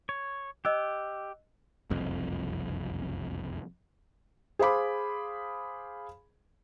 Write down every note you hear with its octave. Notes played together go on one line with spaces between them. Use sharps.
C#5
G4 D#5 E6 F#6
F#1 C2 F2
G#4 C5 F5 B5 D6